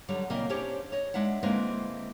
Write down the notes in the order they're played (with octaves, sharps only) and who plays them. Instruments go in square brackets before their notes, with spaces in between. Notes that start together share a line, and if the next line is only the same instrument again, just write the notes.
[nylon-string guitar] D3 F#3 G3
A#2 C#3 A#3 C4 E4 D#5
C#4 D4 G4 C5 C#5
C#5 D#5
G#3 D4 E5 F#5
D3 G#3 A#3 C4 E4 B4